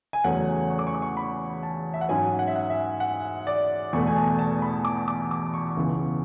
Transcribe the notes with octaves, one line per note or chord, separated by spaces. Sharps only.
G#5
E2 C#3 F#3 A3 C#4 F#5
C#6
D6
C#6
D6
C#6
B5
A5
E5
F#5
G#2 F#3 C#4 G#5
F#5
E5
F#5
E5
F#5
D5
E2 B2 A3 C#6
G#5
A5
A5
B5
D6
D6
D6
C#6
C#2 C#3 E3 B3